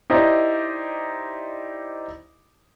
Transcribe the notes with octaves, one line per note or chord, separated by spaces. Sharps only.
D#4 E4 G4 C5 D5 D#5